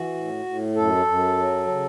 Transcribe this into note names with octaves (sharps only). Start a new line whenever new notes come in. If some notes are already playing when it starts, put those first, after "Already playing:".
Already playing: E3 F#4
A2
A2
F#2 A4
F#2
F#3
C#3